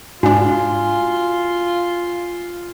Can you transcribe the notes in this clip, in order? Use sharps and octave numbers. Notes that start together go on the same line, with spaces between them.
G#2 D4 F4 F#4 G#5